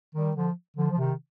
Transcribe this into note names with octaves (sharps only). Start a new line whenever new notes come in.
D#3 G3
D3 F3
D3 F3
F3
C3 D#3